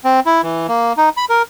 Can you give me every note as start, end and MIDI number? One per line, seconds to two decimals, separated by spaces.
0.05 0.20 60
0.26 0.41 64
0.43 0.67 52
0.69 0.93 58
0.97 1.09 63
1.17 1.25 83
1.30 1.42 70